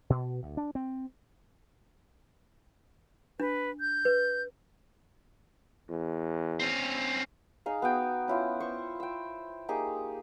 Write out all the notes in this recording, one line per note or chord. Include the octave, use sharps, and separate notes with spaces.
B2
D2
D4
C4
D4 B4
G6
B4
E2
C4 C#4
D#4 G#4 F5
B3 F#4 G5
C#4 E4 F4
C5 C#6
G5 E6
A#3 D#4 G4 G#4